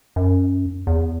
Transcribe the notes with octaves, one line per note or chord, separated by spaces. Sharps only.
F#2
E2